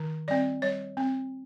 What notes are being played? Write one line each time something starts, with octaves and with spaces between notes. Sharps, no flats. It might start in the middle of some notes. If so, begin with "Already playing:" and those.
Already playing: D#3
G3 C4 D5
G3 C#5
C4